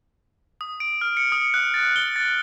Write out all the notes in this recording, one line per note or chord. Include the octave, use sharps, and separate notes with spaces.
D#6
D7
F6
C#7
D#6
F#6
A6
G7
A6